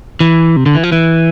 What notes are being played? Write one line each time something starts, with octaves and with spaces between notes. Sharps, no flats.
E3
C3
D3
E3
F3
E3